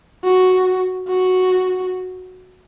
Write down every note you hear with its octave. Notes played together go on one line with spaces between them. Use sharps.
F#4
F#4